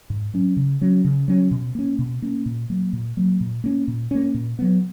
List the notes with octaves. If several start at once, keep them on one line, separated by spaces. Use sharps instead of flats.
G#2
F#3 C#4
C#3
F#3 C#4
C#3
F#3 C#4
B2
A#3 C#4
B2
A#3 C#4
A#2
F#3 A#3
A#2
F#3 A#3
A#2
A#3 C#4
A#2
A#3 C#4
A#2
F#3 B3